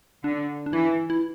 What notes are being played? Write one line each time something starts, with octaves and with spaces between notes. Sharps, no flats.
D3 D4
D4
E3 E4
E4